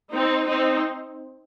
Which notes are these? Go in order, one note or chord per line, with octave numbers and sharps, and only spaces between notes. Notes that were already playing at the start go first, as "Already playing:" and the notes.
C4 D#4
C4 D#4